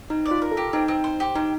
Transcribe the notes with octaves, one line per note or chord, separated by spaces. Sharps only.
C4 D#4
D5
F4
A#4
A4
G4
C4 D#4
C4
C5
G4
C4 D#4